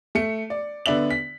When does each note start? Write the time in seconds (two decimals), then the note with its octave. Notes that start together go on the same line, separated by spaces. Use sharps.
0.15 A3 C#7
0.50 D5
0.86 D3 B3 D5 E5 F#7
1.11 B6